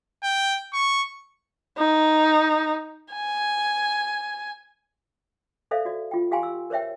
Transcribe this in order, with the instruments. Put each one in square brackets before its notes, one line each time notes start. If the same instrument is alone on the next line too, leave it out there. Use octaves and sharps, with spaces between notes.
[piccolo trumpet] G5
C#6
[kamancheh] D#4
G#5
[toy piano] A4 C5 D5 E5 F5
F#4 D5
F4 G5
G4 F5 G5 G#5 C6
E6
A#4 C5 C#5 E5 G5